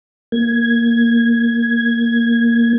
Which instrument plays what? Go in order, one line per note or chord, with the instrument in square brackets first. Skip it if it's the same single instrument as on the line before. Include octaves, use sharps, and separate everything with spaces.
[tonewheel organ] A#3 G#6